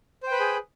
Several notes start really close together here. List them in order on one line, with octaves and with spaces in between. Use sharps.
C5 G5 B4 B5 G#4